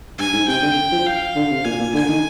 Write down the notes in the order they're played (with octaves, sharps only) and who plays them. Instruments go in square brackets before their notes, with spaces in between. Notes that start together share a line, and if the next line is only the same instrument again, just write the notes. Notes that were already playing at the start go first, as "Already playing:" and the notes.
[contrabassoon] G2 [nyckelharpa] G#5
[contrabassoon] G#2
[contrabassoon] C3 [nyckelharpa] G5
[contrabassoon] D3
F3
[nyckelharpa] F5
[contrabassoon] D3
C3
[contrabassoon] A#2 [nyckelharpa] G#5
[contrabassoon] A#2
[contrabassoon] D3 [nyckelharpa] G#5
[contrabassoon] D#3